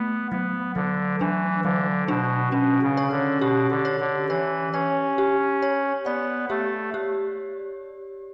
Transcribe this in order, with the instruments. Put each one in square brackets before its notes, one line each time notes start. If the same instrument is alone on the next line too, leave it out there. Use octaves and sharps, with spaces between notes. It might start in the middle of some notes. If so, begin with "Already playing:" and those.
Already playing: [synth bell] A3 [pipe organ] B3
[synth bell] F#3 [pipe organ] B3
[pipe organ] D3 [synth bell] F#3
[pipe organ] E3 [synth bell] D4
[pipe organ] D3 [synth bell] F#3
[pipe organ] B2 [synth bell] D4
[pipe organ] B2 [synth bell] C#4
[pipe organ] C#3
[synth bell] C#5
[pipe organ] D3
[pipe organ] B2 [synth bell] G4
[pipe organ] D3
[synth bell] C#5
[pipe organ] D3
[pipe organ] E3 [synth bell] C#5
[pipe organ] C#4 [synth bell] C#5
[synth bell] G4
C#5
[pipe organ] B3 [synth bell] D5
[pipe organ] A3 [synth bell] G4
[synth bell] G4